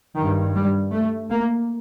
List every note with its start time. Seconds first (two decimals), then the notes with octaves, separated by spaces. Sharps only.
0.16 G2 D#3
0.54 G3
0.92 A3
1.30 A#3